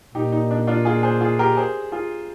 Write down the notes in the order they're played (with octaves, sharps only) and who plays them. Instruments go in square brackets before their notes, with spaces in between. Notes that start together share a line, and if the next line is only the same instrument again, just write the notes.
[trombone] A#2 [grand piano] D#4 G4
[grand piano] D#4
D4
D4 F4
F4 G#4
G#4 C5
F4 G#4
G4 A#4
G#4 C5
F4 G#4